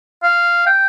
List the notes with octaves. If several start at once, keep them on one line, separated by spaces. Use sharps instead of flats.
F5
G5